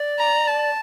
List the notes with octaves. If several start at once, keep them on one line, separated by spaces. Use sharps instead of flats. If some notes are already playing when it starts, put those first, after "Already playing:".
Already playing: D5
A#5
A5